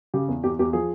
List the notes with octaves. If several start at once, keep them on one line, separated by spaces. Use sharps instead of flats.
C#3 G4
E2
E2 G4
E2 G4
F3 G#4